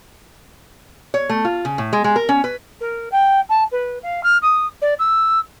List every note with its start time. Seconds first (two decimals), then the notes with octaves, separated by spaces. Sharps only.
1.14 C#5
1.29 A3
1.45 F4
1.65 C#3
1.78 A2
1.93 G#3
2.04 G#3
2.16 A#4
2.29 C#4
2.44 B4
2.81 A#4
3.12 G5
3.49 A5
3.72 B4
4.03 F5
4.23 F6
4.42 D#6
4.82 D5
4.99 E6